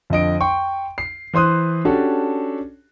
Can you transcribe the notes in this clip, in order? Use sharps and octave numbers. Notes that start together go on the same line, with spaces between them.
F2 D3 D#5 D7
G5 C6 C#6
C7
E3 C5 C6 D#6 F#6
C#4 D4 F#4 G4 A4